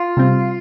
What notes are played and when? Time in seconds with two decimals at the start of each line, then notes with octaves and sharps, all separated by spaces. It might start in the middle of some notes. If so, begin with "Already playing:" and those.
Already playing: F4
0.17 C3 G3 C4